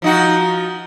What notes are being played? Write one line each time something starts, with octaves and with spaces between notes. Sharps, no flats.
F3 D#4 F#4